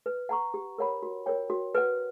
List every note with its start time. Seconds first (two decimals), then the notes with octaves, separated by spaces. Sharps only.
0.06 B4
0.29 F#5 A#5 C#6
0.54 G4
0.78 A#4 C#5 F#5 B5
1.03 F#4
1.26 A#4 C#5 G5
1.50 F#4
1.75 B4 F#5